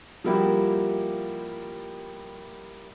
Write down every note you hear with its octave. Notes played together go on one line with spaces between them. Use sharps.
F3 G3 A#3 E4 F#4 G4